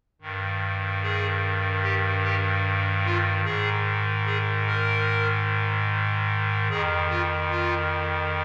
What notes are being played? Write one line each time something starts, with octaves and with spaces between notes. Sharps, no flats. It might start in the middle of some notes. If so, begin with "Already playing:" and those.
G2 D#3
G#4
G4
G4
F4
G#2 D#3 G#4
G#4
A#4
F2 D#3 G#4
F4
F4